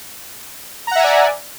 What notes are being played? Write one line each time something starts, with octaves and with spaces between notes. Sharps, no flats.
D5 E5 F#5 G#5 A#5